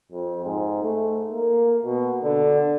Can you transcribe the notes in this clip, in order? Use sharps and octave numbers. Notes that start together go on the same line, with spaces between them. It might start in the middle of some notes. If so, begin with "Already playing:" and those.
F2
G#2
A3
A#3
B2
D3